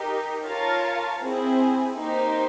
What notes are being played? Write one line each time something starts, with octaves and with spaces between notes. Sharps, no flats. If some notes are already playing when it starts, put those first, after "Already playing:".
Already playing: D#4 G4 A#4
F4 A#4 C#5 F5 A5
C4 E4 G#4
A#3 D#4 G4 C5